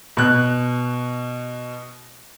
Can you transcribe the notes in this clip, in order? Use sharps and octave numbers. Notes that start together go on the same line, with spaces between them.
B2 F#6